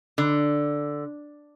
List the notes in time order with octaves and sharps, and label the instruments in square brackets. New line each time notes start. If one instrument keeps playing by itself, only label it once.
[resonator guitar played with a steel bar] D3